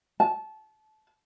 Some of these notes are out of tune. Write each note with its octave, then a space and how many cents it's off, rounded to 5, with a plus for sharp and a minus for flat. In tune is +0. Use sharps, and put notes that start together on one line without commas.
A5 -25